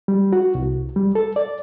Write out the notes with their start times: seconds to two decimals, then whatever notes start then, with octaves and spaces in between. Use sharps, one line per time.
0.08 G3
0.33 F#4
0.55 C2
0.96 G3
1.15 A4
1.36 D5